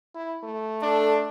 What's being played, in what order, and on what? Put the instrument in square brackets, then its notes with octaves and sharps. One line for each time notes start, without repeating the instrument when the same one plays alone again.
[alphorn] E4
A3
[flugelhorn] D4 [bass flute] A4